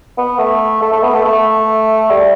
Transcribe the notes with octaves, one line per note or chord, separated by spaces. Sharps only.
B3
A3
A3
A3
B3
A3
A3
G3